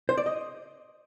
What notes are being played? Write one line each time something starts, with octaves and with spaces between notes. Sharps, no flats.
C5
D5
D#5